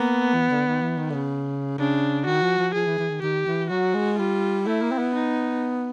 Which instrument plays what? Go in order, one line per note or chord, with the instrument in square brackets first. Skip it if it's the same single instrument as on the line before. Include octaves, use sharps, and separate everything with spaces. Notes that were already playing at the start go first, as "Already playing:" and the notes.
Already playing: [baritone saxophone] A#3 [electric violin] B3
[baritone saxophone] E3
D3
D#3
E3
D#3
D3
C#3
[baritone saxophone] C#3 [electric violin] D4
[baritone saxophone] D#3 [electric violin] F#4
[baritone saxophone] F3
F3
[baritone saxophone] F3 [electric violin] G#4
[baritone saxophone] E3
E3
D#3
[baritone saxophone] D#3 [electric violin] G4
[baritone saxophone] E3
[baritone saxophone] F#3 [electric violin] F#4
[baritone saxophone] G#3
[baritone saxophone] G3 [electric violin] F4
[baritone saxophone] A3 [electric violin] E4
[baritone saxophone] A#3
C4
B3
[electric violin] D#4